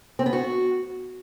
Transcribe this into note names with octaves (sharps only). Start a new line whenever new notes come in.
C4
B3
F#4